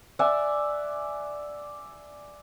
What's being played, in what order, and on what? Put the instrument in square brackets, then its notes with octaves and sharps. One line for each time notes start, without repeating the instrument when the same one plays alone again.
[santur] D5 E5 F#5 G#5